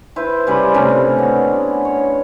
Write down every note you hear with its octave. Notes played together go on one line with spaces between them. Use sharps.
E4 B4 C5 E5
C#3 G3 C5 B5
A2 C3 C#4 D4
B3
C#5